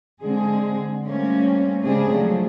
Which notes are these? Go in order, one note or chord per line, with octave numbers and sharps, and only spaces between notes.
D3 G#3 C4 G#4
G3 A3 A#3 C4 C#4
C#3 G#3 C4 D4 G#4
F3 F#3 A3